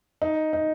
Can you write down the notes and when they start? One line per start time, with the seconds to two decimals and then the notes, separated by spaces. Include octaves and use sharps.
0.22 D#4
0.53 D#4